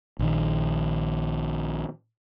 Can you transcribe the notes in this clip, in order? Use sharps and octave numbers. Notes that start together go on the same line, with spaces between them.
A#1 D#3